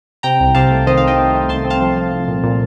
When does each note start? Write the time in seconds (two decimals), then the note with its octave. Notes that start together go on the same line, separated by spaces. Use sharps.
0.23 C3 G5 A#5
0.40 C2
0.55 C3 F5 A5
0.71 A3
0.86 D#3 C5 D#5
0.97 F5
1.02 C2
1.07 D#5 G5
1.18 A3
1.34 A3
1.49 C2 A5 C6
1.65 C4
1.70 F5 A5
1.81 F3
1.96 F3
2.12 C2
2.28 A#2
2.44 A#2